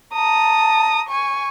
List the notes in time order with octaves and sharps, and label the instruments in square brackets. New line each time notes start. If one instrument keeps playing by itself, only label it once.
[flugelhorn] A5 [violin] A#5 D#6
[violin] G#5 C#6